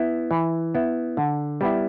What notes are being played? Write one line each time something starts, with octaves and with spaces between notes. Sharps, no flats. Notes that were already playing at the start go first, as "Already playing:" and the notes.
Already playing: B3 E4
E3
B3 E4
D3
G3 B3 E4